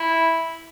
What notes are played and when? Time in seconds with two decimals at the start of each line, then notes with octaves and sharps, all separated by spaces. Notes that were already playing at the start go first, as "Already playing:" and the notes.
Already playing: E4